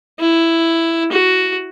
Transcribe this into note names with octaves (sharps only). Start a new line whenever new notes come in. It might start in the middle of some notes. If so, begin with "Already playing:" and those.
E4
F#4